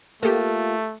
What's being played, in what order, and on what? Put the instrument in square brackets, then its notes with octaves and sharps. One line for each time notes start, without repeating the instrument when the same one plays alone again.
[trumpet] A3 [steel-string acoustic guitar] A#3 F4 [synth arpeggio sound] G4 A4